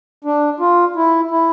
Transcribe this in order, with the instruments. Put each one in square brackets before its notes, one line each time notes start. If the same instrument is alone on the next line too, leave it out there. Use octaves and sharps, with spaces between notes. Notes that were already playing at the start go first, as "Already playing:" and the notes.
[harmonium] D4
F4
E4
E4